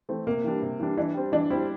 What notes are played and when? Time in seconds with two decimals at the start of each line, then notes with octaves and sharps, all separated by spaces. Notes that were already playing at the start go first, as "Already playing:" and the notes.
0.09 E3 A3 C4
0.27 C3 A#3
0.44 E3 G3 D4
0.62 C3
0.80 E3 G3 D4
0.97 E3 D4
1.14 G3 C4
1.32 E3 D4
1.50 G3 C4 E4